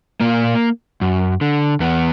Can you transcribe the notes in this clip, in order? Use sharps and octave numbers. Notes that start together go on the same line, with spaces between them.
A#2 A#3
F#2
D3
E2 B3